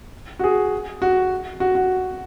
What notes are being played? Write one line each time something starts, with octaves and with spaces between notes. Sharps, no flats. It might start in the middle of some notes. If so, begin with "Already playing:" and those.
F#4
G#4
F#4
F#4
F#4